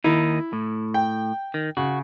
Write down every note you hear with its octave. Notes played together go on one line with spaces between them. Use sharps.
D#2 D#3 D#4 E4
A2
G5
D#3
C#3 F#4